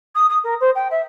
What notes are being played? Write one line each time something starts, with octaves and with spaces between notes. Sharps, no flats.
D#6
D#6
A#4
C5
G5
E5